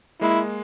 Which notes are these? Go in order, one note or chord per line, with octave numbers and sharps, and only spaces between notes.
G#3 A#3 E4